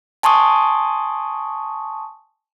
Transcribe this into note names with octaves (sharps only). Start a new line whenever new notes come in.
G#5 A5 C6 C#6 D#6